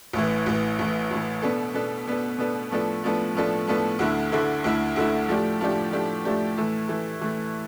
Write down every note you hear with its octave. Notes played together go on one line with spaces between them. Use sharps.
A1 A2 E3
A1 A2 E3
A1 A2 E3
A1 A2 E3
B2 B3 D4 A4
B2 B3 D4 A4
B2 B3 D4 A4
B2 B3 D4 A4
A2 F3 B3 D4 A4
A2 F3 B3 D4 A4
A2 F3 B3 D4 A4
A2 F3 B3 D4 A4
D2 D3 A3 E4
D2 D3 A3 E4
D2 D3 A3 E4
D2 D3 A3 E4
A2 F3 A3 D4 G4
A2 F3 A3 D4 G4
A2 F3 A3 D4 G4
A2 F3 A3 D4 G4
A2 E3 A3
A2 E3 A3
A2 E3 A3